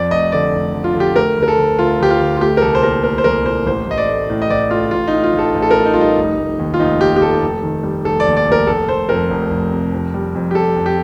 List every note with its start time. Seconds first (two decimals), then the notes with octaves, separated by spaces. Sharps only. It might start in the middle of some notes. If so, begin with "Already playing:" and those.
Already playing: F2 D5
0.11 F1 D#5
0.32 D3 D5
0.53 F1
0.74 D3
0.84 F4
0.95 D3
1.00 G4
1.15 A3 A#4
1.38 D2
1.43 A#4
1.48 A4
1.58 D2
1.78 D2 F4
2.00 D2 G4
2.10 F4
2.20 D2
2.37 F4
2.41 A3 G4
2.57 A#4
2.62 C2 A4
2.75 C5
2.83 A#2 A#4
3.04 A3 A#4
3.18 C5
3.24 C2 A#4
3.45 A#2 C5
3.66 A1 C5
3.87 A1 D#5
3.98 D5
4.08 A3
4.30 A2
4.42 D#5
4.50 A1 D5
4.70 A3 F4
4.91 A1 F4
5.08 D#4
5.13 A2
5.24 F4
5.33 A1
5.39 A4
5.54 A1
5.62 A4
5.70 A2 A#4
5.85 D#4
5.93 F4
5.96 G3 D#4
6.17 F1
6.37 F1
6.59 D#2
6.74 F4
6.80 F1 D#4
7.00 F1 G4
7.16 G4
7.21 F1 A4
7.42 F1
7.63 D#3
7.83 G3
8.04 F1 A4
8.20 D5
8.26 D#2
8.37 D5
8.46 F1
8.52 A#4
8.67 F1 A4
8.88 F1 C5
9.09 F2 A#4
9.31 F1
9.50 F1
9.72 C3
9.92 F2
10.14 G3
10.35 F2
10.51 G4
10.55 G3 A4
10.76 F2
10.86 G4